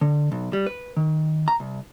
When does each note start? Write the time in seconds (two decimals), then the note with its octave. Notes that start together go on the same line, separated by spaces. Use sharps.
0.01 D3
0.32 B1
0.53 G3
0.66 B4
0.97 D#3
1.48 A#5
1.60 C2